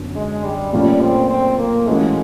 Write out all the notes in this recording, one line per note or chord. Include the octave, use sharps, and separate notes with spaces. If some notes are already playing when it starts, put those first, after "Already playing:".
Already playing: F#2 D3 F#3 B3
G#3
G3
A#2 F3 G3 A3 C#4 F4
C4
C4
A#3
E3 G#3 A3 C#4 F#4